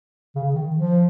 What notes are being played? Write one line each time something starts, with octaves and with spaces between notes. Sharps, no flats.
C#3
D#3
F3